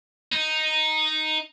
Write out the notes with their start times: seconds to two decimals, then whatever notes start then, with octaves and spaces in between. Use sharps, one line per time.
0.33 D#4